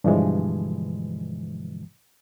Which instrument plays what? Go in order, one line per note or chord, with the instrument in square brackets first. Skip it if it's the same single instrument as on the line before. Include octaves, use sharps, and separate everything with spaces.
[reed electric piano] G2 B2 D3 E3 F3 G#3